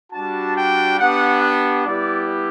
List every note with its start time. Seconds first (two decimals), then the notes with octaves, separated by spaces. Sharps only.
0.12 G3 D4 F#4 A5
0.55 G5
0.99 B3 D4 G4 F#5
1.41 F#5
1.85 G3 B3 E4 G4 D5